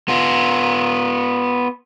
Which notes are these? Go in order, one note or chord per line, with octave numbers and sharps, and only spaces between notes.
B3 F4